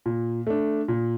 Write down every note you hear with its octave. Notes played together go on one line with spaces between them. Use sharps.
A#2
A3 D4
A#2